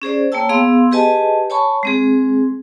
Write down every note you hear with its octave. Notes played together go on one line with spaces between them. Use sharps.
C#4 G#4 C5 D5
A#3 C#5 G5 A5 E6
B3 G#4 F5 C6 E6
G4 G#4 B4 D#5 G#5 A5
C#5 G#5 A5 B5 C#6
G#3 C4 G#4